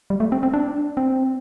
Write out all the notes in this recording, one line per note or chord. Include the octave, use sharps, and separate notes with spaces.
G3
A3
C4
C4
D4
C4